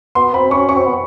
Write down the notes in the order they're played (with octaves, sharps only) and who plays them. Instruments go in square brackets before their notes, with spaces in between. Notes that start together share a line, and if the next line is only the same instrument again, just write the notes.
[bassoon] B3 [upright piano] C6
[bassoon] C4 [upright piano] B5
[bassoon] C#4 [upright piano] C#6
[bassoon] C#4 [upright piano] C#6
[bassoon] C4
B3